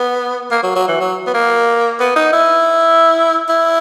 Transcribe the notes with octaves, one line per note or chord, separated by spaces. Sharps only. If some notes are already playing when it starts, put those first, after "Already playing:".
Already playing: B3
A#3
F#3
F#3
E3
F#3
B3
A#3
B3
D#4
E4
E4